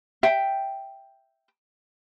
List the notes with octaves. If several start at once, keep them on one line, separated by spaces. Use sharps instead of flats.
E5 G5